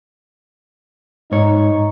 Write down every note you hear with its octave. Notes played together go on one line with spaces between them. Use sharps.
G#2 D#4 C#5